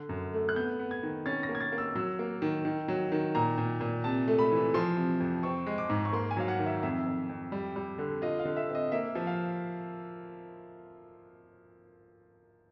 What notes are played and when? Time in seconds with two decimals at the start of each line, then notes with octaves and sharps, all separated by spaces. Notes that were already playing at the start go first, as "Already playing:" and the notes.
Already playing: D3
0.09 F#2
0.33 A3
0.49 F#6
0.56 B3 G6
0.79 B3
0.91 G#6
1.03 D#3
1.26 C#4 A6
1.43 A#6
1.49 A#3
1.55 G#6
1.60 A6
1.72 A#3
1.78 E6
1.95 F#3 E6
2.19 A#3
2.42 D#3
2.65 D#3
2.88 F#3
3.12 D#3
3.35 A#2 A#5
3.58 A#2
3.81 A#2
4.04 C3 A5
4.28 A3
4.39 B5
4.51 E3
4.74 F3 C6
4.97 C3
5.20 F2
5.43 C4 C#6
5.66 G#3
5.78 D6
5.89 G#2
6.05 C#6
6.13 A#3 C6
6.31 G#5
6.37 F#3 F5
6.48 F#5
6.59 D#3
6.66 E5
6.83 F2 E5
7.06 F2
7.29 F2
7.52 G3
7.76 G3
7.98 D3
8.22 F4 D#5
8.39 F5
8.45 D3
8.57 E5
8.69 C4
8.75 D#5
8.92 A#3 E5
9.15 F3
9.27 F5